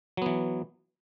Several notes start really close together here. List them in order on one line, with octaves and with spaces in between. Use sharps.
F#3 B3 E3